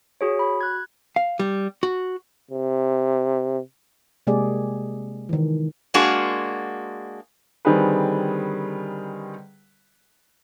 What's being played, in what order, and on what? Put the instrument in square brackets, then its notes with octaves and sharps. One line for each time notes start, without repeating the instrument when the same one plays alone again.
[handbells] F#4 G#4 C#5
F#4 B5
F#6 G#6
[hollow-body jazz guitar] F5
G3
F#4
[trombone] C3
[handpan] C3 G#3 A#3 G4 G#4 D5
D#3 E3
[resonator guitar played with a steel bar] G#3 A#3 D4 F#4 G#4
[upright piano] D3 D#3 G3 C4 G#4 B4